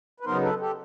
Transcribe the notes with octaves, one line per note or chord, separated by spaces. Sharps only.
B4
C#3 F#3 B3 D#4 A#4 C5
A4 B4
G4 A4